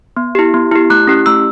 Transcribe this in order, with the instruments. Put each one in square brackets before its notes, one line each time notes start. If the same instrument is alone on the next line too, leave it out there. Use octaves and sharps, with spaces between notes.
[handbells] B3
E4 G4
B3
E4 G4
A3 F#6
C#4 E4 G4
A3 E6